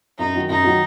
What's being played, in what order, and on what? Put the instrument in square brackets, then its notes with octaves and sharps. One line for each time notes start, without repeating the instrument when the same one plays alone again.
[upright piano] F#2 [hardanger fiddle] D#4
[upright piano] D#3 F#3
[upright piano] F#2 [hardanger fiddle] D#4
[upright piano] D#3 F#3